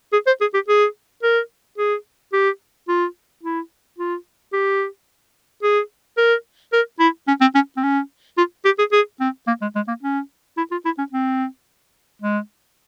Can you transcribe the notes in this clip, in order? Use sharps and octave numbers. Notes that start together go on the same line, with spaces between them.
G#4
C5
G#4
G4
G#4
A#4
G#4
G4
F4
E4
F4
G4
G#4
A#4
A#4
E4
C#4
C4
C#4
C4
C#4
F4
G4
G#4
G#4
C4
A#3
G#3
G#3
A#3
C#4
E4
F4
E4
C#4
C4
G#3